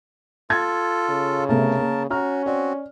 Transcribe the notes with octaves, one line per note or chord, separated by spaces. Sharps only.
F4 A4 G#6 A6
C#3
C3 A3 B3 A#4 A5
A#3
C#4 F#4 A#5 F6
C4 F#4 D5